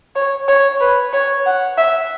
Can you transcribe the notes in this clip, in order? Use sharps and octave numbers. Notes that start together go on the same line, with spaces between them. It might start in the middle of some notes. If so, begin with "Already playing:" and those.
C#5
C#5
B4
C#5
F#5
E5